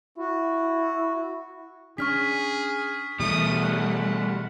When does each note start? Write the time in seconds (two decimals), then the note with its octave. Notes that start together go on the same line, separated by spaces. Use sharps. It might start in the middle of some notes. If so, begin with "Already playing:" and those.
0.18 E4 F#4
1.98 C#4 D4 G#4 C#6 F6 B6
3.19 B2 E3 G3 A3 D#6
3.58 F#5